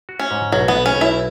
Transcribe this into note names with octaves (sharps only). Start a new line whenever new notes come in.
F#4
C#4
G#2
B1 F#3
B3
B1
C#4
B1
E4